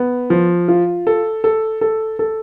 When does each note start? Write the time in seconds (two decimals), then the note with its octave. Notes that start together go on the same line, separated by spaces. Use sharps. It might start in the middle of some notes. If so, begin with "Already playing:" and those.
Already playing: B3
0.30 F3
0.68 F4
1.07 A4
1.44 A4
1.81 A4
2.19 A4